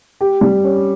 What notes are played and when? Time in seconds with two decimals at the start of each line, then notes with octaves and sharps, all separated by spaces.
0.21 G4
0.41 G3
0.64 C#4